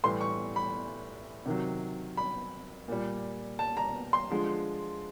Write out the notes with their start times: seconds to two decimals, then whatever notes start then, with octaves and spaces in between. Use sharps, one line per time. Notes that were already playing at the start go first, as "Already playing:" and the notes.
0.04 A2 E3 G3 C6
0.21 C#6
0.56 B5
1.46 C3 D#3 F#3
2.17 B5
2.88 A#2 G3
3.59 A5
3.77 A#5
4.13 C6
4.30 D3 F3 G#3